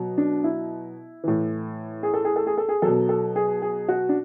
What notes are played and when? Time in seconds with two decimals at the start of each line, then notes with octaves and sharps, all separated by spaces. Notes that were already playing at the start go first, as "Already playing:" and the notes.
Already playing: B2 F#3
0.18 D4
0.44 E4
1.24 A2 E3
2.03 G#4
2.14 A4
2.25 G#4
2.36 A4
2.47 G#4
2.58 A4
2.69 G#4
2.82 B2 F#3 A4
3.09 A4
3.36 G#4
3.62 G#4
3.88 F#4
4.09 D4